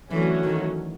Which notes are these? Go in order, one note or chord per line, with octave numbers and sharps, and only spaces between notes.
D3 E3 F#3 A3 C#4 F#4
D#3